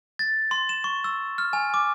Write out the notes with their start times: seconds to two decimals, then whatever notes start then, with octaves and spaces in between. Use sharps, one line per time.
0.19 A6
0.51 C6
0.69 E7
0.84 C#6
1.04 E6
1.38 F6
1.53 G#5
1.74 D6